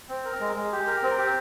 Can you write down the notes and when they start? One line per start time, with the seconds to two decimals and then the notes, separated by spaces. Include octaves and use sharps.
0.08 C4
0.25 A#4
0.40 G#3
0.56 G#3
0.72 G4
0.87 A#4
1.03 C4
1.18 G4